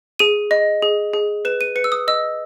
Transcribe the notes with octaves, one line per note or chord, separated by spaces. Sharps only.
G#4 D#7
D#5
G#4
G#4
B4 E7
D#7
B4 C#7
E6
D#6
D#5 E6